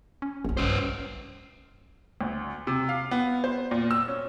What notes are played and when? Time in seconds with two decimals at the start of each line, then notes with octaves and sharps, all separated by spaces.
0.22 C#4
0.45 A#1 B3 C#4
0.57 C#2 G2 C#4 C5
2.21 D2
2.67 C3
2.89 F5
3.11 B3
3.44 C5
3.71 A#2
3.91 E6
4.08 C#4